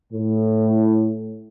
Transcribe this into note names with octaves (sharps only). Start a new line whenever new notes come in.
A2